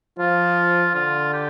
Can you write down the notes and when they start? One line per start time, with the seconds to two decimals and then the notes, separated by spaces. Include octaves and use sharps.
0.19 F3 F4
0.95 D3 F4
1.33 G4